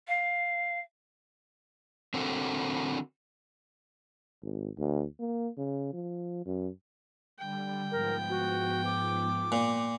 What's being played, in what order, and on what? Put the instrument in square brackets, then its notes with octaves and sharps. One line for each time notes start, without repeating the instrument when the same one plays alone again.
[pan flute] F5
[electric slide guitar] D3 C4 F#4 A4 A#4
[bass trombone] G#1
D2
A#3
C#3
F3
F#2
[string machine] D3 G3 [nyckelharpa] G5
[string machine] G#2 F3 B3 [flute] A#4
[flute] F#4
D6
[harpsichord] A#2